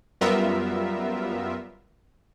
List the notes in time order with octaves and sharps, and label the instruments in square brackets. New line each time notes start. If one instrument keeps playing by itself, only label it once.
[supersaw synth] F#2 G3 B3 F4 A#4 E5